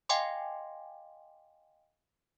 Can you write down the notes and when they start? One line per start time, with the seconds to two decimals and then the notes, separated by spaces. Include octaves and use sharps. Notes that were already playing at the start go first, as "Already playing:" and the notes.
0.09 D#5 F5 G5 G#5 C6 D6